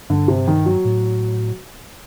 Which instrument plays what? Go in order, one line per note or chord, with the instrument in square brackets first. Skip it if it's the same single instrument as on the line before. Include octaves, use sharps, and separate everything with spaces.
[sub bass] G2 [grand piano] D3
[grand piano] C3
D#3
F#3
[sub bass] A2